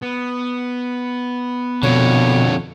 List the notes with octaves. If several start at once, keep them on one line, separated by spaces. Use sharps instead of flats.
B3
F2 B2 D3 C#5